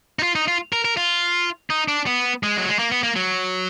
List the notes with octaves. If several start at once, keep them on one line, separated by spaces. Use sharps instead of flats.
D#4
F4
D#4
F4
A#4
A#4
F4
D#4
D4
B3
G#3
F#3
G#3
A#3
B3
A#3
F#3